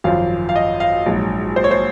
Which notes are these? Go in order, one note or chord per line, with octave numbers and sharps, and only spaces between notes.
G#1 F#2 F3 F5
F5
D#5
F5
A#1 G#2 F#3
C5
C#5
C5